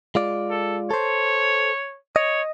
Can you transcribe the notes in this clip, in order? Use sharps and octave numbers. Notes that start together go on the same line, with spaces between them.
G#3 F4 D5
A4
A4 C5 C#5
C#5 D#5